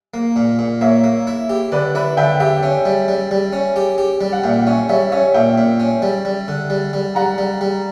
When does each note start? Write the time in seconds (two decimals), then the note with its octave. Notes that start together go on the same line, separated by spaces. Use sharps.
0.14 A#3
0.36 A#2
0.59 A#2
0.81 A#3 C#5 E5
1.04 A#3
1.27 E4
1.50 G4
1.72 D3 B4 D5
1.94 E4 B4 D5
2.17 D3 E5 G5
2.40 G4 E5 G5
2.63 C#4
2.85 G3
3.08 G3
3.31 G3
3.53 C#4
3.76 G4
3.98 G4
4.21 G3
4.32 F#5
4.44 A#2 E5 G5
4.59 F#5
4.66 C#4 C#5 E5
4.89 G3 C#5 E5
5.12 C#4 C#5 E5
5.34 A#2 E5 G5
5.58 A#2
5.80 C#4
6.02 G3
6.25 G3
6.48 D3
6.70 G3
6.93 G3
7.15 G3 F#5 A#5
7.38 G3
7.61 G3